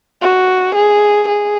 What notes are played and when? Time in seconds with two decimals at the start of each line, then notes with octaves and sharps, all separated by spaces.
0.22 F#4
0.75 G#4
1.29 G#4